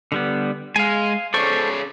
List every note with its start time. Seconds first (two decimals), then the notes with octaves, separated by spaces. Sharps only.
0.12 D3 G3 B3
0.76 G#3 F5 G#5
1.34 C#4 G#4 A4 C5 D5 C#6